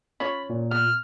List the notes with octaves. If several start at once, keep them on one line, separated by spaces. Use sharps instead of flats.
C#4 F4 C#5 B5
A#2
B3 F6